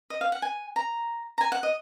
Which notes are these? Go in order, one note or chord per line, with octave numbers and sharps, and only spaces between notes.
D#5
F5
F#5
G#5
A#5
A#5
G#5
F#5
D#5